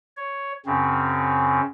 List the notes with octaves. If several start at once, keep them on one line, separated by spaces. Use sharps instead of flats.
C#5
F#2 C#3 C4